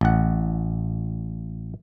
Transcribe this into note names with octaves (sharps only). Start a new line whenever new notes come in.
A1 F#5